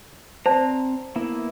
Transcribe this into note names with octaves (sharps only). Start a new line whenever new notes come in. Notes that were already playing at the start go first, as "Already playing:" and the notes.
C4 C5 D5 A5 A#5
A#3 B3 E4